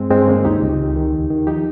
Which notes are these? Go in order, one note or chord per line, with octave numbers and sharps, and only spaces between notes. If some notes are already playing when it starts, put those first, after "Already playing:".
Already playing: G2 G#3 C4
G2 G#3 C4
D#3 A#3 C#4
C#2 D#4 G4
C#2
D#3
D#3
D#2
D#3
F3 D#4 G4